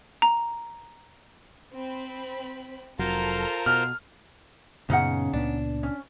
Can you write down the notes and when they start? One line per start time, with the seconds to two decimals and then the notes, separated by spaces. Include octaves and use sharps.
0.22 A#5
1.74 C4 B5
2.99 F1 F#3 F4 A4 A#4 C5 A#5
3.66 B2 F6
4.90 F#2 A#2 C#3 B3 C#4 D#4 F#5
5.33 C#2 A#2 B3 D4
5.83 C#4